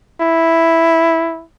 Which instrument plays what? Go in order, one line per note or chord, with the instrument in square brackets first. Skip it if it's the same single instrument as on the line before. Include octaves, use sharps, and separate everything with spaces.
[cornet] E4